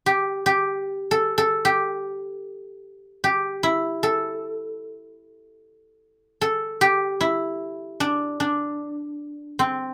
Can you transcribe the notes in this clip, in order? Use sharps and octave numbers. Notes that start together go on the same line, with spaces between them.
G4
G4
A4
A4
G4
G4
E4
A4
A4
G4
E4
D4
D4
C4